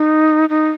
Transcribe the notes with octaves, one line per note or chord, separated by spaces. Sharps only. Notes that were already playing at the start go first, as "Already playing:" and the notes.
Already playing: D#4
D#4